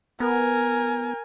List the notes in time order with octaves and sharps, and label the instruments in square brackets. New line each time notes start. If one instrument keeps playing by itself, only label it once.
[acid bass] B3 [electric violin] A#4 G#5